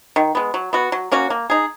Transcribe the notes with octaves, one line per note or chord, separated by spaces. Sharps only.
D#3
G#3 B3
F#3
B3 F#4
F#3
A#3 C#4 F#4
A#3
D#4 G#4